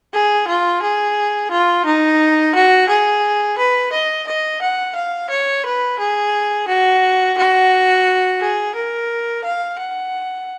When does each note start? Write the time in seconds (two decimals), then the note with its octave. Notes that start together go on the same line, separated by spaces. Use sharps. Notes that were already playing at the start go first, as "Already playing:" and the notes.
0.14 G#4
0.48 F4
0.82 G#4
1.51 F4
1.86 D#4
2.55 F#4
2.89 G#4
3.58 B4
3.93 D#5
4.28 D#5
4.62 F#5
4.96 F5
5.30 C#5
5.66 B4
5.99 G#4
6.68 F#4
7.38 F#4
8.41 G#4
8.75 A#4
9.44 F5
9.79 F#5